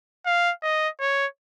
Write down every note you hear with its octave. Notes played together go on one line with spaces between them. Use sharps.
F5
D#5
C#5